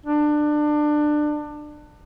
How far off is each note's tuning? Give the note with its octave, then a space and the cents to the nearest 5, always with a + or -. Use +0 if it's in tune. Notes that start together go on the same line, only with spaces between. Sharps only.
D4 +25